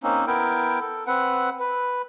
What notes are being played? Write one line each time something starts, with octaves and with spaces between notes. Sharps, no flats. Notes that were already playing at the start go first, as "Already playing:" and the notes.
A#3 C4 C#4 D#4
B3 E4 A#4 G5
A4
C4 B4 F#5
B4